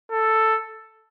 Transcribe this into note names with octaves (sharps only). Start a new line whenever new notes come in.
A4